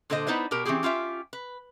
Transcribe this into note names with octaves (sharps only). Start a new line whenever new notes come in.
A#2 D3 A4 C5 D#5
B3 D#4 E4 B4 C5 D5
B2 G4 A#4
E3 C4 C#4 G4 G#4
C#4 F4 G4 E5
B4